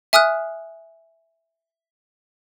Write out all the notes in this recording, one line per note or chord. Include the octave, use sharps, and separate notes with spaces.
E5 G#5 D#6 F6 F#6